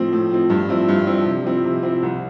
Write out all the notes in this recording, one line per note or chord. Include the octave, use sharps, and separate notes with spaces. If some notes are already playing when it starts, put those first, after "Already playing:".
Already playing: A2 F3 C4
A2
F3 C4
G2
F3 C4 E4
G2
F3 C4 E4
C3
F3 C4 E4
C3
F3 C4 E4
C2